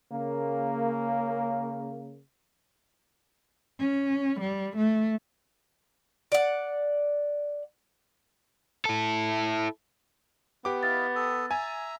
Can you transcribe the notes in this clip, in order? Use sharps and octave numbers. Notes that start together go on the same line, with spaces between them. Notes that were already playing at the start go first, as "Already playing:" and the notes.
C#3 A#3
C#4
G3
A3
D5 F#5
E4 A4
B3 G4 D6
E4 D#5 F5 A6
A4 D#6
E5 G#5 A#5